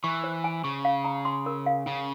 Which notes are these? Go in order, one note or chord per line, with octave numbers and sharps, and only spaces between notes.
E3 C#6
C5
G#5
C#3 C#6
F5
A#5
C6
A#4
F5
C#3 C#4